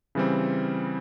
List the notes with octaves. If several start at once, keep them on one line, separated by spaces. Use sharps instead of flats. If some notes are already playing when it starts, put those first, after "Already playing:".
C#3 E3 G3 C4